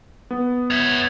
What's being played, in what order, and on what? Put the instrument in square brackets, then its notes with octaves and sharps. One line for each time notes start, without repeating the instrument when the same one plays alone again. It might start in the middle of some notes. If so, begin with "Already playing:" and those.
[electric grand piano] B3
[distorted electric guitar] C#5 E5